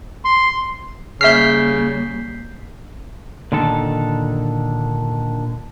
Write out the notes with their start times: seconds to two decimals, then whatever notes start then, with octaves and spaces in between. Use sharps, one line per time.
0.25 C6
1.21 C#3 G3 A#3 E5 F6 G6 B6 C7
3.52 A#2 D3 D#3 A4